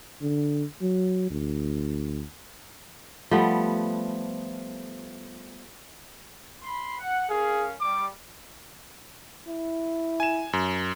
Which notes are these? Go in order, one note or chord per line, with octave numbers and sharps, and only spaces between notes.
D3
F#3
D2
F3 G3 A3 B3
B5 C6
F#5
C#4 G#4 A#4 F5
G3 D6
E4
G#5 E7
F#2